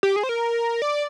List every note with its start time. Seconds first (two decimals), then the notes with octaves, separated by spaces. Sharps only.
0.03 G4
0.16 G#4
0.23 C5
0.29 A#4
0.82 D5